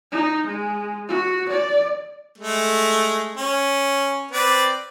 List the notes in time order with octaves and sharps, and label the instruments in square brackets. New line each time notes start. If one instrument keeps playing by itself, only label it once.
[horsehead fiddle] D#4
G#3
F#4
D5
[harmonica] G#3 A3
C#4
C4 B4 D5